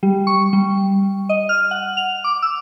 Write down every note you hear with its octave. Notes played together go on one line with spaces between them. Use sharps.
G3
C#6
G3
D#5
F6
F#5
F7
D6
E6